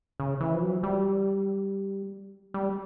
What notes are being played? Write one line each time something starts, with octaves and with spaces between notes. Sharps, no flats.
C#3
E3
F3
F#3
G3
G3